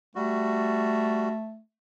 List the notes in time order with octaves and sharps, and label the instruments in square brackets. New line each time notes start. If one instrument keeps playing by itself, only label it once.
[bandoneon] G3 F#4 [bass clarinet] A3